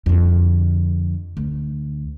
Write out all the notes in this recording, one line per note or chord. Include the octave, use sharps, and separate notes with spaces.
F2 D3
D2